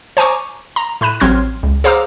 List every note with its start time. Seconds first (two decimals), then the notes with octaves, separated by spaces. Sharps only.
0.17 C5 G#5 A#5 C#6 D6
0.76 A#5
1.01 A2 B5 F#6 D#7
1.20 A1 F#3 C4 C6 F6 G#6
1.63 C#2
1.84 G#4 C5 F5 A#5 D6 E6